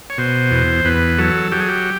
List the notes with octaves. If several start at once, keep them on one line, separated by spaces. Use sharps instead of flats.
C#5
B2 C5
E2
E2 B4
F#3 A4
F#3 G4
G#4
G4